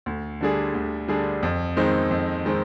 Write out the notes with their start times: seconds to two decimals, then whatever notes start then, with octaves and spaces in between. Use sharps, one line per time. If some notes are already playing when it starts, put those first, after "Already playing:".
0.06 D2
0.41 D3 G3 D4 G#4
0.75 D2
1.08 D3 G3 D4 G#4
1.43 F2
1.76 D#3 G#3 C4 D#4
2.11 F2
2.45 D#3 G#3 C4